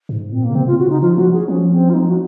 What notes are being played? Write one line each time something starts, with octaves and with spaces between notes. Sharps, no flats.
G#2
A#2 C4
A#3
C#3
C3 C4
F4
C#3
C3 F#4
C#3 D#4
F3 F4
F3 F#4
G#4
F3 C#4
C4
F4
F3 D#4
F#4